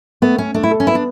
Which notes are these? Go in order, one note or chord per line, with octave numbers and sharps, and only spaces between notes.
A3 B3
A3 C#4
A3 D4
E4
A4
C#4
B3 E4
D4